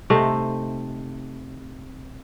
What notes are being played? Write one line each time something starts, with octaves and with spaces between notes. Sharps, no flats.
C3 A3 D#4 C5